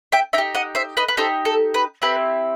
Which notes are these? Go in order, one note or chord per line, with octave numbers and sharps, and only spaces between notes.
E5 G5
D#4 G4 E5 G5
D#5 F#5
C5 E5
B4 D#5
B4
D#4 G4 A4 C5
A4
B4
C4 E4 G4 B4